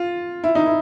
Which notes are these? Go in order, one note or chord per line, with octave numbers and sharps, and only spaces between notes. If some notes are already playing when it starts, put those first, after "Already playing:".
Already playing: F4
E4
D#4
E4